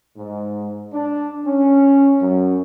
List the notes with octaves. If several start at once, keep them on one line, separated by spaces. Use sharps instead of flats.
G#2
D4
C#4
F#2